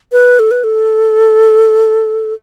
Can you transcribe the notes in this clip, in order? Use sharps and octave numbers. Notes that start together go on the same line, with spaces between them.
B4
A4
B4
A4